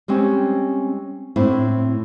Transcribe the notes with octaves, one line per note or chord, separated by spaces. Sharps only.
G3 G#3 C4 C#4
A2 C4 D4 E4